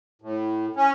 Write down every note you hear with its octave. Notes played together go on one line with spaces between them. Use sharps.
A2
C#4